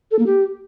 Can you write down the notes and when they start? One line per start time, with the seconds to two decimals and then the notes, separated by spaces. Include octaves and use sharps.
0.11 A4
0.19 A#3
0.26 G4